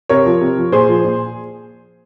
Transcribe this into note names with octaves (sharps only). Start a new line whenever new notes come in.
C3 A#4 C#5
F3
C3
F3
A#2 G#4 C5
F3
A#2